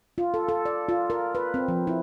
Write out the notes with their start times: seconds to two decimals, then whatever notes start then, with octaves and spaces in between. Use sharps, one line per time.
0.18 F4
0.34 A4
0.49 A4
0.65 D5
0.89 F4
1.10 A#4
1.35 B4
1.54 C4
1.68 F3
1.87 E4